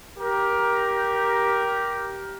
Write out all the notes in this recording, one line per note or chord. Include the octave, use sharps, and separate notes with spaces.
G4 A#4